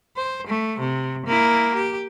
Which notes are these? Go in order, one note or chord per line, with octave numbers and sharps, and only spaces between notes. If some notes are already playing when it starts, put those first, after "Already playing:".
C5
A3
C3
A#3 E4
G4